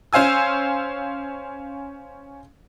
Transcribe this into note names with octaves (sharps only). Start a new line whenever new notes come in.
C#4 C5 F5 G#5 E6